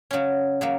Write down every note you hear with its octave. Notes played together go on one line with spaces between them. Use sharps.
C#3 F#3 C#4
C#3 F#3 A#3